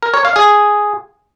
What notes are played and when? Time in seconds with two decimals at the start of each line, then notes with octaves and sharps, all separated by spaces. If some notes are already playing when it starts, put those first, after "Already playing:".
0.03 A#4
0.14 C#5
0.25 F5
0.36 G#4